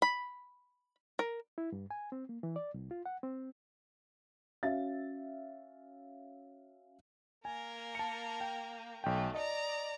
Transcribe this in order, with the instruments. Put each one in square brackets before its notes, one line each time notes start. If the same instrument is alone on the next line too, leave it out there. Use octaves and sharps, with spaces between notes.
[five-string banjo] B5
A#4
[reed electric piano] E4
G2
G#5
C4
A#3
E3
D5
C2
F4
F#5
C4
[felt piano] C#4 F#4 E5 F5 A6
[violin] A#3 A#4 [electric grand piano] G#5
[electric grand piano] A5 C#7
G5
[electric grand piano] B1 G5 [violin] A3
[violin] D5 A#5 [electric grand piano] D#5